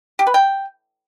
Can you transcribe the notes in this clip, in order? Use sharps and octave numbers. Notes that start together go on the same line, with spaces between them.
G4
B4
G5